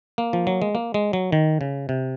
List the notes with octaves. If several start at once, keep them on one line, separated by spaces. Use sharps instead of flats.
A#3
F3
F#3
G#3
A#3
G#3
F#3
D#3
C#3
C3